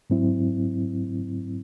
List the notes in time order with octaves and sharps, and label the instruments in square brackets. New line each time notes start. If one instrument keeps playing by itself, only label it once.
[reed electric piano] G#2 F#3 C4 E4